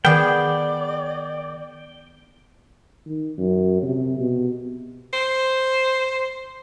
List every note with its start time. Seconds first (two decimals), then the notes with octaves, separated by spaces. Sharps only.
0.05 D#3 B3 G#4 D5 G5
3.06 D#3
3.38 F#2
3.83 C3
4.19 B2
5.13 C5